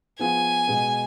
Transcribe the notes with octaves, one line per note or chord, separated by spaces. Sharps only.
F3 B3 F4 G#4 G#5
B2 G#3 B3